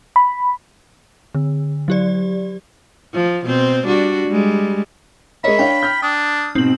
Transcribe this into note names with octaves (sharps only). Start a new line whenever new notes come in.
B5
D3
F#3 G4 D5
F3
B2 C4 C5
G3 D4 F#4
G3 G#3
G#3 A#4 C#5 D#5 E5 B5
D4 C#5 F5 G5
F6 G6
D4 D#6
G#2 B2 C4 F#7